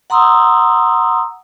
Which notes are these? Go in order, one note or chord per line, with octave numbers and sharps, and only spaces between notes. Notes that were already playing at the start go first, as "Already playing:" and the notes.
F#5 A#5 C6 D#6 E6